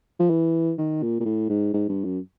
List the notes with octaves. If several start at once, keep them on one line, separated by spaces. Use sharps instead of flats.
F3
E3
D#3
A#2
A#2
A2
G#2
G#2
G2
F#2